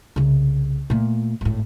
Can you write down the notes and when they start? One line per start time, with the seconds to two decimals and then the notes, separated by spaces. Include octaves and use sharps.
0.16 C2 C#3
0.90 A#2 A3
1.41 G#1 A2